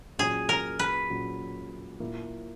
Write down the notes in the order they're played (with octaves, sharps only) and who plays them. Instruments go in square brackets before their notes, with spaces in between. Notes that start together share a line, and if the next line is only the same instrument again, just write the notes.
[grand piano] A#2 F#3 C#4 [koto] G#4
[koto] A#4
B4
[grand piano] A#2 F#3 C#4
A#2 A#3 E4